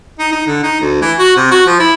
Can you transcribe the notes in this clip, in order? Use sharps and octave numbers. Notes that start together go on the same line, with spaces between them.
D#4
D#4
D3
D#4
D2
E3
F#4
C3
F#4
F3
E4